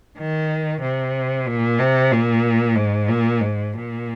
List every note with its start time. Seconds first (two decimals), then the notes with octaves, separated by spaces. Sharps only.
0.18 D#3
0.82 C3
1.47 A#2
1.79 C3
2.12 A#2
2.76 G#2
3.08 A#2
3.40 G#2
3.74 A#2